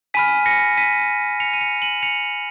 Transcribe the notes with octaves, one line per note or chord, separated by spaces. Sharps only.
G#5 B5 F6 B6 D#7
A#6 C#7
B6 D#7
C#7 F7
D#7
C#7 F7
D#7 F#7
C#7 F7